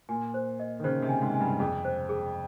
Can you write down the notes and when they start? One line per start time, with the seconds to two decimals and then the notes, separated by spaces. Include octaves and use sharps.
0.09 A#2 G#5
0.34 C5
0.60 D#5
0.80 D#3
0.84 C#3 C5
1.02 C3
1.09 G#5
1.22 G#2
1.34 G#5
1.40 G2
1.60 F2 G#4
1.85 C5
2.09 G#4